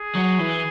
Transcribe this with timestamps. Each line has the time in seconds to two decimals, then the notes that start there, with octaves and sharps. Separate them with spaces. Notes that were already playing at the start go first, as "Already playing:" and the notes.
Already playing: G#4
0.15 F#3
0.38 E3